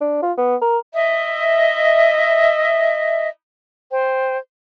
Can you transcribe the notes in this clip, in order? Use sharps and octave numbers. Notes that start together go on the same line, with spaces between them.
D4
F4
B3
A#4
D#5 E5
C5 G5